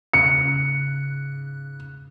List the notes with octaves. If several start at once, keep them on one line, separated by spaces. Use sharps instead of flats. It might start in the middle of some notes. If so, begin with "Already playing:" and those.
G#2 C#3 F#6 C#7